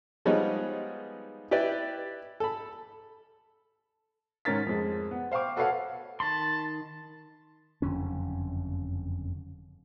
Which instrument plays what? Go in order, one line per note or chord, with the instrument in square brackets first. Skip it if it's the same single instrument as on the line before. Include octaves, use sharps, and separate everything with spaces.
[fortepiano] F3 G3 G#3 B3 D#4 C#5
E4 G4 B4 D5
A4 B5
[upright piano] G#2 D#3 C#4 A#4 A6 B6
F2 G#3
B3
C5 F5 G5 C#6 D6
F#4 A4 B4 C#5 F5 F#5
[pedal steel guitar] D#3 B5 C6 [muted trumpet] A5
[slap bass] F#1 F2 D3 C#4